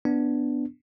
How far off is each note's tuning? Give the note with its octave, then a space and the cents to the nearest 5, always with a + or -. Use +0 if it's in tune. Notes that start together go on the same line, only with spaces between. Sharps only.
B3 +0 D4 +0